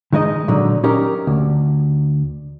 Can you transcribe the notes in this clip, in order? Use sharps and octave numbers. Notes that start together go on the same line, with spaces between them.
D#3 G#3 D#4 D#5
A#2 D3 F#3 D#4
C#4 D#4 G4 A#4
D2